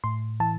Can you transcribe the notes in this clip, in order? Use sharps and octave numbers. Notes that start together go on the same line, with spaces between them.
A2 C6
E3 A5